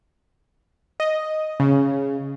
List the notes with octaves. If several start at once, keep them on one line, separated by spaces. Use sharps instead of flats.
D#5
C#3